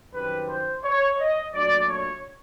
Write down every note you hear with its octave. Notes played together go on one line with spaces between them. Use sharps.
F#2 D#3 G3 C4 B4
C5
C#5
D#5
A#2 F#3 A3 D4 D5
C#5